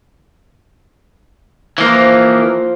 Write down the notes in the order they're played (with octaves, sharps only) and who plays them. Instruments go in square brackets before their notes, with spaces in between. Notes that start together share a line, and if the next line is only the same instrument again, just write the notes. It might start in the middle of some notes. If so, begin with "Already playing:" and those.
[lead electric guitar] E3 A#3 [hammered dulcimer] F3 C5